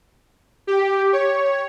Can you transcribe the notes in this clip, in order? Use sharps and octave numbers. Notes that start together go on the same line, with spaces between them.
G4
C#5